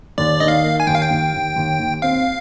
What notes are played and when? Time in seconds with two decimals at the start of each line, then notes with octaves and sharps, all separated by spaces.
0.18 D#2 D5
0.40 D#3 D#5
0.48 F5
0.64 A#3
0.80 G#5
0.87 D#2 G5
0.95 F5
1.02 G5
1.11 D#2
1.34 D#2
1.56 D#2
1.80 D#2
2.02 C4 F5